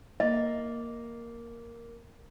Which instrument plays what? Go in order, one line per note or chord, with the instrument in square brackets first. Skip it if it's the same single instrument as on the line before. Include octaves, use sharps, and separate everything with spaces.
[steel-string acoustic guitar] A#3 [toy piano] D#5